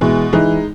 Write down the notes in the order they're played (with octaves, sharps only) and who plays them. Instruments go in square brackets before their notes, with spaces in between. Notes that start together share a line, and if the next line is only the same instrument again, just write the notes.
[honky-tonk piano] B2 [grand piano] E3 G#3
[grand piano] E3 [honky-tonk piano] G#3 D#4